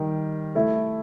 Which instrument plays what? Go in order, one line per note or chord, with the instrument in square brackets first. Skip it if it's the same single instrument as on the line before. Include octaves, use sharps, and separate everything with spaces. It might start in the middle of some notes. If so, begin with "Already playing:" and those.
Already playing: [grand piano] D#3 G3
A3 E4 A4